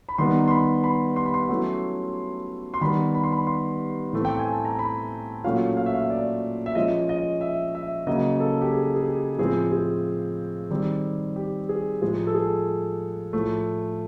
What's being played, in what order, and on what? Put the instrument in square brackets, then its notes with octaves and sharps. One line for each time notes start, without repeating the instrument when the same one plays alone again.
[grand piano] B5
D#3 G3 B3 D#4 C6
C6
B5
B5
C6
B5
C6
F#3 A3 C#4 E4
C6
D#3 G3 B3 B5
B5
C6
B5
C6
A2 E3 A3 C4
G5
G#5
A5
A#5
B5
A#2 F#3 A3 C#4 F4 F5
F5
E5
F5
D5
E5
F3 G#3 C#4 F4 D#5
D#5
E5
E5
C#3 F#3 A#3 D#5
A4
G4
G#4
G#4
G4
A2 F3 G#3 C4 G#4
G#4
D#3 G3 C4
G4
G#4
A2 F3 G#3 G#4
A4
G#4
A2 F3 A3